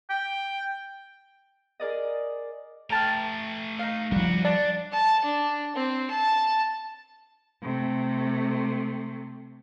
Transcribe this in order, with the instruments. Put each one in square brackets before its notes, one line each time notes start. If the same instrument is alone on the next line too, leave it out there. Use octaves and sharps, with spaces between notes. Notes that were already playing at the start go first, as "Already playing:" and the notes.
[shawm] G5
[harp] G#4 A#4 D5 D#5
[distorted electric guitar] A3 A#5 [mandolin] G5 A5 F6
[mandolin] D#4 F5
[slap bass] F3 G3 [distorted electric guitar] D4 F#4
[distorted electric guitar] D4 [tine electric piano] D5 [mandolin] A5
[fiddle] A5
D4
C4
A5
[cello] C3 A3